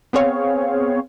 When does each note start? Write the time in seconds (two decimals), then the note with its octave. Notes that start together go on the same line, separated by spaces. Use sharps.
0.13 B3 C4 G#4 C#5 F5